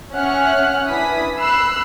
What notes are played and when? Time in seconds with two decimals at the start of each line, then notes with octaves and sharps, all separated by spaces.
0.14 C#4 E5 F#5 F6 F#6
0.88 D4 E4 B4 G#5 D#6 B6
1.38 B5 E6 F#6 C7